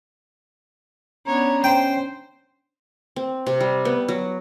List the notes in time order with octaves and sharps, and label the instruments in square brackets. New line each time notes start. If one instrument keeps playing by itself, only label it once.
[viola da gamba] B3 D4 C#5 [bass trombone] C#4 [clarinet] A#5
[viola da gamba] C5 [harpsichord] G5
[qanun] C4
C3
G3
B3
F#3